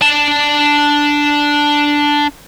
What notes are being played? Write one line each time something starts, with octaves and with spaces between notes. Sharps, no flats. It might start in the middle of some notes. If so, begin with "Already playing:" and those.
D4 A5